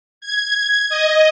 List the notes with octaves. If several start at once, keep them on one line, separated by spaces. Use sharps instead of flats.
G#6
D#5